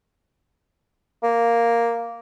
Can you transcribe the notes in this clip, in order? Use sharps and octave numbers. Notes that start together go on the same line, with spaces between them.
A#3